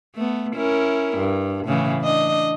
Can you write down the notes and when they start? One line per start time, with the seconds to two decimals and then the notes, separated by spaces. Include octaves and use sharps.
0.16 A3 B3
0.56 C#4 E4 A#4
1.18 G2
1.67 A2 C#3 E3
2.02 D4 D#5